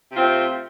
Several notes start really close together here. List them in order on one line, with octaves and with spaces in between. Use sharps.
C3 F4 C4 A3